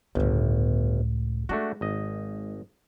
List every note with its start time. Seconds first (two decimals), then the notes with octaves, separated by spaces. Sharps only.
0.15 G1 C#2 A2
1.49 G#3 A3 D4 F#4
1.81 G#1 D#5